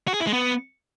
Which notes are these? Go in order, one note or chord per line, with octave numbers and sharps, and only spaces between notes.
F#4
G#4
E4
G#3
B3